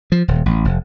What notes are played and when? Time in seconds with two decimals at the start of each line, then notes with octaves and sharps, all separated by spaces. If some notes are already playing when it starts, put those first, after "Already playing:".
0.12 F3
0.28 D#1
0.46 A1
0.65 F1